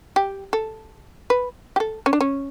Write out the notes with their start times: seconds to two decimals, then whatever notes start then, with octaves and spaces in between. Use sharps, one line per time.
0.16 G4
0.53 A4
1.30 B4
1.76 G4
1.80 A4
2.06 C#4
2.13 D4
2.21 C#4